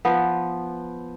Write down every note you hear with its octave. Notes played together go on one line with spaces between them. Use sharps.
F3 B3